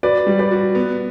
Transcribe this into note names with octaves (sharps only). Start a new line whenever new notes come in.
F#4 B4 D5
G3
B4 D5
F#4
B3